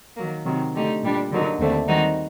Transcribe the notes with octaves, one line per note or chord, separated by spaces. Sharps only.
D#3 F#3 A#3
C3 D#3 F#3
D3 A3 D#4 G4
A#2 G3 D4
D3 F#3 A#3 D#4
D#2 D3 A3 C4
D#3 G3 C4 D#4 F#4